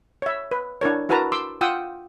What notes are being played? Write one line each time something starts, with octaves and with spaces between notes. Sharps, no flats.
C#5 E5
B4
D4 E4 A#4 C#5
E4 F#4 A#4 B4 A5 A#5
C6 D6 E6
F4 F#5 G5 D#6 E6